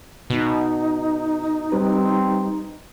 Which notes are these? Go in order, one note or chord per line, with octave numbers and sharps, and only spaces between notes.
B2 D#4
G3 C4 G4 B4